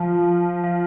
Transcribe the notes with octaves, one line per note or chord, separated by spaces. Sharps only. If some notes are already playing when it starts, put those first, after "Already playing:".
Already playing: F3
F3